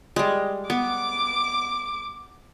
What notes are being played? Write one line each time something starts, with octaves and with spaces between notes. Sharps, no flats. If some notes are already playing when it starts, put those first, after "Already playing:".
G3 G#3
B3 D6